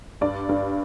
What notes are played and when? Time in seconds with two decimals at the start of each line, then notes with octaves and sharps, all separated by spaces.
0.21 G2 D5
0.49 G2